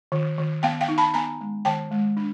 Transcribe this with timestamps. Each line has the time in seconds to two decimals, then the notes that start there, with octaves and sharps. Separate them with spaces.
0.12 D#3
0.38 D#3
0.63 B3 F5 G5
0.81 F5 G5
0.88 D#4
0.98 A5 B5
1.14 B3 G#5 A#5
1.41 G#3
1.65 D#3 G5 A5
1.91 G#3
2.17 D4